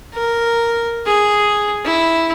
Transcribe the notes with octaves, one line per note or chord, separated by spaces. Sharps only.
A#4
G#4
E4